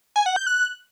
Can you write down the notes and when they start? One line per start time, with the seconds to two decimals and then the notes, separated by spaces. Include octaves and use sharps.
0.16 G#5
0.26 F#5
0.36 G6
0.47 F#6